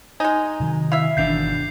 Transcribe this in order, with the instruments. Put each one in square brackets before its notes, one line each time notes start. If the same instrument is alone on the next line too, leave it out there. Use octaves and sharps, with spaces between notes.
[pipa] G#3 D#4 [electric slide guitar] G#5
[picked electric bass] C3 D#3 F#3
[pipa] E4 E5 [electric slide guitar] F5
[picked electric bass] G1 D#3 E3 [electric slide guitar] B2 D4 [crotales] G6 C7 F7